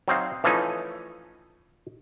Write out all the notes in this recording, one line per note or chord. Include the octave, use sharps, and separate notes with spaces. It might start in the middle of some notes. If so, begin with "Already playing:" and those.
F#3 C4 D#4 F5
E3 F3 A3 C#4 D#4